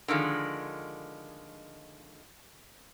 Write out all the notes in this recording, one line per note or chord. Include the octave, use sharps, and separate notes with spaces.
D3 D#3 F3 G#3